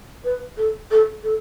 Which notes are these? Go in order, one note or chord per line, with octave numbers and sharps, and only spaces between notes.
B4
A4
A4
A4